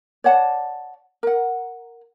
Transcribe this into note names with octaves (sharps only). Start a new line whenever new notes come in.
C#5 D5 F#5 A5
A#4 F#5